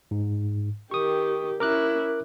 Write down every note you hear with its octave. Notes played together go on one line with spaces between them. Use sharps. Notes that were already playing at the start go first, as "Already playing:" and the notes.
G#2
D#3 G4 C#6 D#6
C#4 E4 A#4 D6 F#6